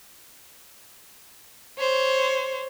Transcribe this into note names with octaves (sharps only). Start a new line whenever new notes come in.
C5 C#5